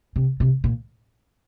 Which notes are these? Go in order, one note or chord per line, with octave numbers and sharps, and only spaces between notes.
C3
C3
A#2